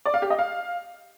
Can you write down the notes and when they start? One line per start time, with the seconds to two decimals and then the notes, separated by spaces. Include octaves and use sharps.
0.05 D5
0.14 F5
0.22 G4
0.30 D#5
0.39 F5